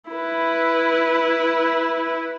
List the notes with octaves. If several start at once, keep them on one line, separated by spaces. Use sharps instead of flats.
E4 B4